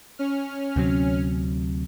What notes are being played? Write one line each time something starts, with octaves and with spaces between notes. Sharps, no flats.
C#4 F6
D2 C3 F#3